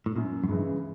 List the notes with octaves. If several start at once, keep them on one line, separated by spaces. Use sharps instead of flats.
A2
F#2 A#2
F#2
G2 C#3 E3 G#3